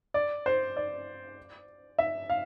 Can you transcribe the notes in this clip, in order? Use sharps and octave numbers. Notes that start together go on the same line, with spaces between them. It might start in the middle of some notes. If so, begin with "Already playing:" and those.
D5
C5
D5
E5
F5